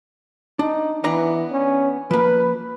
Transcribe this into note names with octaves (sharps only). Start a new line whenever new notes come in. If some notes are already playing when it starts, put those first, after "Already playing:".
D4 D#4
E3 B3 D4 A#5
C#4
F3 A#3 B4